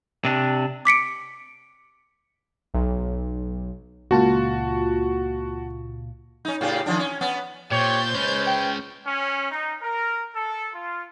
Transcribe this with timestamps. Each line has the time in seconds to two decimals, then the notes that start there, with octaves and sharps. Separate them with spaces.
0.25 C3 D4
0.85 D6 B6 C#7 D7
2.74 B1
4.11 C#2 A#2 F4 F#4 A5
6.45 C#4 D#4
6.61 A2 C#3 G4
6.86 D#3 F3 D4
6.99 C#4
7.21 B3 C#4
7.71 A#2 G4 C5 C#5 G6 A6
8.14 G#3 C#4 B4 C#5
8.47 G5
9.06 C#4
9.51 D#4
9.83 A#4
10.35 A4
10.74 F4